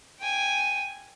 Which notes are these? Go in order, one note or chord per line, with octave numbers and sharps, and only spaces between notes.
G5 G#5